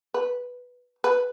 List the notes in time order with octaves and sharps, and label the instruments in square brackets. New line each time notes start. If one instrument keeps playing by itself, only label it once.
[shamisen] B4
B4